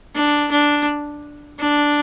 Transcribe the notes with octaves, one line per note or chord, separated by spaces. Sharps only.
D4
D4
D4